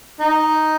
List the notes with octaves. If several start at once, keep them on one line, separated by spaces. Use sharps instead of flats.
D#4